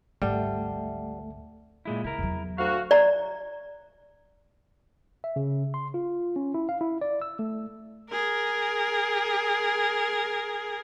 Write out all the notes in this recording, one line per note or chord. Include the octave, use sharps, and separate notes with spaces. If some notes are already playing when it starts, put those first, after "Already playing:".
G#1 D2 G3 A3 E5 F#5 A5
A#2 G#3 E4
C#3 E4 A#4
E2 F#3
D2 F#4 F5
D5 A#5
E5
C#3
C6
F4
C#4
E4
F5
E4
D5
E6
A3
G#4 A#4